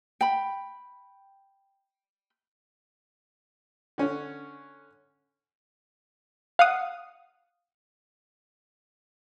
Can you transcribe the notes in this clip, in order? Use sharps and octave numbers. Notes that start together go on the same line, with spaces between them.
G5 B5
D3 C#4
F5 F#5 D#6